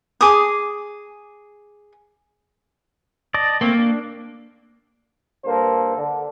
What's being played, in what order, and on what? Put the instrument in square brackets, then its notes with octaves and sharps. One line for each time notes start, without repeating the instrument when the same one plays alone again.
[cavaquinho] G#4 D6 D#6
[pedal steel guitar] D5 D#5 A5
[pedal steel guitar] A3 C4 [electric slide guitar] A#3
[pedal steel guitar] D4
[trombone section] G2 A#3 A4 C5
D3